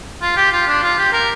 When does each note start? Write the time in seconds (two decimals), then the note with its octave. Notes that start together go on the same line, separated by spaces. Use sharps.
0.22 F4
0.36 G4
0.52 F4
0.67 D4
0.83 F4
0.98 G4
1.13 A#4